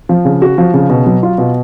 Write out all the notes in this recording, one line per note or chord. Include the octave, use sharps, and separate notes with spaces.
F3
C#3
F#4
F3
C#3
B2
F#3
F4
B2